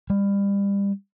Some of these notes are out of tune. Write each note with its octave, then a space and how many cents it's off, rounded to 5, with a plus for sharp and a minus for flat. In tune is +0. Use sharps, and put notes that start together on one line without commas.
G3 +30